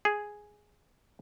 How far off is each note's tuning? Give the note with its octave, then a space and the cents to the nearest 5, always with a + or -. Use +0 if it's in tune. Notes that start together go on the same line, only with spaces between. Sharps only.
G#4 +0